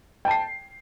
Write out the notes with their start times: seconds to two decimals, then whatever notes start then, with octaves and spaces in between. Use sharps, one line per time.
0.25 G5
0.28 A5
0.31 C7